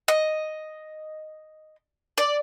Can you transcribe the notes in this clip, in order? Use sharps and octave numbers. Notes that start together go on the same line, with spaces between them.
D#5
D5